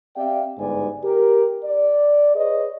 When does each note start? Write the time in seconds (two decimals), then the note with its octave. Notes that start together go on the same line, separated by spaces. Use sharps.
0.16 C4 G4 D5 E5 F5 G5
0.58 G1 G#2 D#4 B4 D5 G#5
1.03 G4 A#4
1.63 D5
2.35 G#4 B4 C#5 D#5